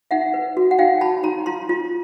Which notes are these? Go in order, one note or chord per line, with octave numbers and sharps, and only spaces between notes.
D#4 E5 F#5
B4
F#4
F#5
D#4 F5 G5
F#4 A5 B5
D#4 A#5 C6
F4 A#5 C6
F4